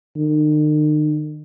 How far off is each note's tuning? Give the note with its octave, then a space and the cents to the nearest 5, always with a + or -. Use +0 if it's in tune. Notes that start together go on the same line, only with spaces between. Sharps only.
D#3 -40